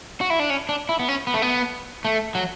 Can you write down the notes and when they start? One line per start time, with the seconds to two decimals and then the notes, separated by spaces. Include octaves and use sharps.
0.21 F#4
0.30 E4
0.39 D4
0.50 C#4
0.69 D4
0.89 E4
0.99 B3
1.09 C#4
1.27 B3
1.34 A3
1.42 B3
2.05 A3
2.35 F#3